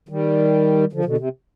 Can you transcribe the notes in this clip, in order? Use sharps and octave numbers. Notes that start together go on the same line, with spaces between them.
D#3 G3
D3 F3
B2 D3
C3